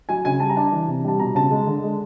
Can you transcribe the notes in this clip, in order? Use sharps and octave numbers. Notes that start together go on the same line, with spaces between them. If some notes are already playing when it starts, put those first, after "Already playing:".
F#3 G#5
C#3 G#5
G3 A5
A#5
D4 A5
E3
C3
G3 A5
B2 A#5
C#3 A5
G#3
D3
G#3